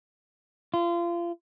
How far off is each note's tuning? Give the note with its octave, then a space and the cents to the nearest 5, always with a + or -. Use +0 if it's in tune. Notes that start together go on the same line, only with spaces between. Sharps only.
F4 -30